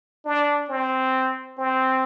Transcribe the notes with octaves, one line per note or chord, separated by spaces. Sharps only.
D4
C4
C4